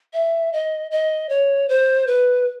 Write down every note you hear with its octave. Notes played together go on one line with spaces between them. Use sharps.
E5
D#5
D#5
C#5
C5
B4